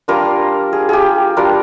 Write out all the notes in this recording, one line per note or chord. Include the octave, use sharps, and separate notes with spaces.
G3 A#3 D4 F4 A#4
G#4
G4 G#4
G3 D4 F4 A#4